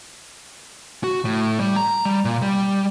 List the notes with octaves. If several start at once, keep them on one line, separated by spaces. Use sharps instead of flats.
F#4
A2
G3
A#5
G3
A#2
G3